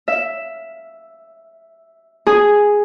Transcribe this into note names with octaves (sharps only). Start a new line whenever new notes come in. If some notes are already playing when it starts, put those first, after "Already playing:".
E5
G#4